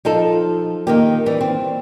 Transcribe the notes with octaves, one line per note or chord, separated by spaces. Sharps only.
F3 D#4 F4 A4
D#3 A#3 G4
E3 G3
C4